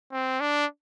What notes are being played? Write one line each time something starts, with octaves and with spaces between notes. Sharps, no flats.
C4
D4